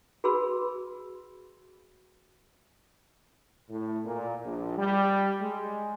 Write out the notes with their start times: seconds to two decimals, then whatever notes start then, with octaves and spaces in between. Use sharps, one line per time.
0.24 F#4 G#4 B4 B5 C6 E6
3.69 A2
4.04 A#2
4.45 A#1
4.77 G3
5.40 G#3